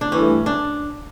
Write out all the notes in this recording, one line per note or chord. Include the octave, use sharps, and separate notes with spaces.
D4
G2 E3 A3 C#4
D4